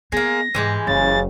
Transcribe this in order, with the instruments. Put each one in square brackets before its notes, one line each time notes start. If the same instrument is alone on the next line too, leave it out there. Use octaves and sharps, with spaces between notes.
[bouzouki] G#3 A#3 [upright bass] B3 [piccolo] A#6
[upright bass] G#2 [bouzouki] E3 G#3 G4
[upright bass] F#1 [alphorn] C#3 [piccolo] A6